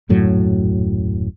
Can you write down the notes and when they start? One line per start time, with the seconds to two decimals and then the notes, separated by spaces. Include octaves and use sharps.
0.09 D#1 F#2 A2 F#3